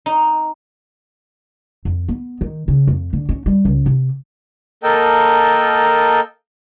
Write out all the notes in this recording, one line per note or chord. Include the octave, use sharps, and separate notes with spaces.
D#4
F2
B3
D#3
C#3
F2
D3
C#4
G3
C#2
C3
A#3 A4 A#4 D#5 G5 A5